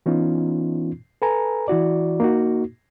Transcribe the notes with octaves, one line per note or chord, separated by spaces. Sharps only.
E3 B3 C#4 D#4 F4
A4 B4 G#5 A#5
E3 E4 F#4 D5
A#3 D#4 F#4